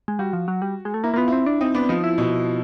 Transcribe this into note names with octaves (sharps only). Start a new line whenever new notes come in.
G#3
G3 F#4
F3
F#3
G3
G#3
A3
A#3 E4
A#3 B3 F4
C4 E4
D4
C4 D#4
B3 D4
F3 D#4
E4
B2